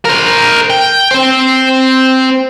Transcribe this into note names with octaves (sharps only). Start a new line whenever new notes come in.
A#4 C5
G5
C4 C5